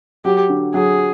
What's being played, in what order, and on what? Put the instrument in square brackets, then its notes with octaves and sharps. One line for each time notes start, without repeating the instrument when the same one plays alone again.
[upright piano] F#3 [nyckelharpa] G4
[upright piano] D3
[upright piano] F#3 [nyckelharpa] G#4